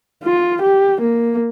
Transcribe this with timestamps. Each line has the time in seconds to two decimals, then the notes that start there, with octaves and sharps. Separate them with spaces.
0.23 F4
0.62 G4
1.02 A#3